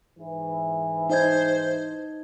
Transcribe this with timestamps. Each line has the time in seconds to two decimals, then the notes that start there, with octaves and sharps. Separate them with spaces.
0.18 G#2 E3
1.10 D#4 C5 D#5 G#6